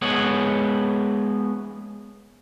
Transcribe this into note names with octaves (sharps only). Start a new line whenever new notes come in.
G#3 B3 C#5 F#5